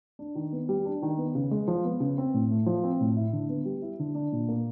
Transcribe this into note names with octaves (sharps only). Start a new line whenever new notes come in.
D4
D#3
B3
G3
D4
D#3
B3
C#3
G#3
F3
B3
C#3
C4
A2
A3
F3
C4
A2
E4
D3
B3
G3
E4
D3
D4
A#2
A#3